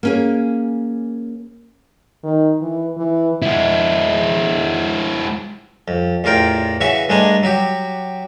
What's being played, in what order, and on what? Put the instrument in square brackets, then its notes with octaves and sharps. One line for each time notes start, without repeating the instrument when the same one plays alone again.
[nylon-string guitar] A#3 C#4 G#4
[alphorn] D#3
E3
E3
[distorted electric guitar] G#3 E4
[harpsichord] F2
A1 E2 F4 A#4 G5
C#3 E3 F#4 E5 C#6
G2 G#3 A3 D4 G#5 A#5
F#3 F#4 G4